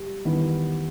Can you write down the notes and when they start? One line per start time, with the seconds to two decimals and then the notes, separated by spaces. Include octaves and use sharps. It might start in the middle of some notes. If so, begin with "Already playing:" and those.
Already playing: G3
0.25 E2 D#3 G3 B3 E4